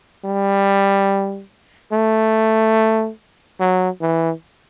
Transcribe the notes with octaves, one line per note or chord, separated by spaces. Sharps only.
G3
A3
F#3
E3